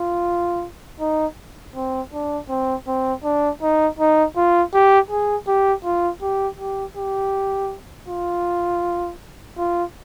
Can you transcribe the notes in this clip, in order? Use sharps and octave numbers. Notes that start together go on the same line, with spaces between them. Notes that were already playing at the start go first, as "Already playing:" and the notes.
Already playing: F4
D#4
C4
D4
C4
C4
D4
D#4
D#4
F4
G4
G#4
G4
F4
G4
G4
G4
F4
F4